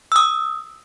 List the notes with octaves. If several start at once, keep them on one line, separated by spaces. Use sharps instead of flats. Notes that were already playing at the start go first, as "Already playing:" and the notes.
D#6 E6